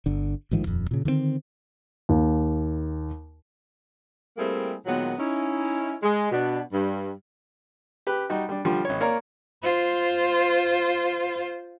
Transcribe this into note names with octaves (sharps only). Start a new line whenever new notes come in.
G1 D3
A1 G#2 D#3 F3
D#1 F2
A#2 C#3
D3 D#3 A3 C4
D#2
G3 A3 A#3 C4 E4 G#4
A#2 D#3 F#3 G#3 B3
C#4 D#4 E4
G#3
B2 D4
G2 G3
G4 B4
G3 D#4 F#4
G3 D4
D3 F3 G3 F4
G#1 C#5
A#3 A#4 C#5 D5 F5 A#5
F4 C5